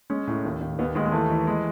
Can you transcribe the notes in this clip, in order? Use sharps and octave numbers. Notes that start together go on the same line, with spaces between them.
G#3 C#4
A2
D#2
D#2
D#2 B3
D#2 G#3
G#3
E3 A3
E3
G#3